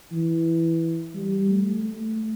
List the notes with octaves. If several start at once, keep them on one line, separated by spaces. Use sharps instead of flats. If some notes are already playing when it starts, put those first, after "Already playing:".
E3
G3
A3
A3